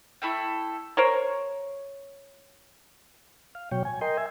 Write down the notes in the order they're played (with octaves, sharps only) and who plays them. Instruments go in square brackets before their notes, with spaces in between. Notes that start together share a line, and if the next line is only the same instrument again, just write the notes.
[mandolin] A3 E4 A4 G5
[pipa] A#4 C5 C#5
[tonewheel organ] F5
B2 F#3 C#5 G5
G#5
A#4 D#5 G5 C6
E5 G#5